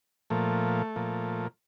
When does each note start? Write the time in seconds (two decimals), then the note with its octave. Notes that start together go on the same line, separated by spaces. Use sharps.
0.30 A#2 F3 A3
0.96 A#2 F3